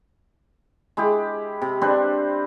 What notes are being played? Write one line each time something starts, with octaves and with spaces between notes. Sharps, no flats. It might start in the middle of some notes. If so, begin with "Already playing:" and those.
G#3 E4 G4
C3
C4 D4 B4 C5